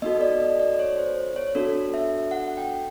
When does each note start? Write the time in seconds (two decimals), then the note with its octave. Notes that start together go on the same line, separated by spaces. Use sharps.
0.02 B3 D#4 F#4 A4 D#5
0.21 D5
0.40 D#5
0.60 D5
0.79 C#5
0.98 C5
1.36 C#5
1.55 B3 D4 F#4 A4
1.94 E5
2.31 F#5
2.57 G5